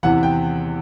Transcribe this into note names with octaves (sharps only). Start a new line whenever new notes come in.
E2 C3 E3 F#5
G5